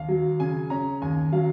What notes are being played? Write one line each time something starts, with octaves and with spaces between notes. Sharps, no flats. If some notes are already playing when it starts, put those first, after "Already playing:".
Already playing: D#2 F5
F#3
C#3 G#5
C#4 A#5
D#2 G#5
F#3 F5